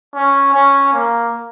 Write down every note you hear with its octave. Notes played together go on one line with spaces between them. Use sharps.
C#4
C#4
A#3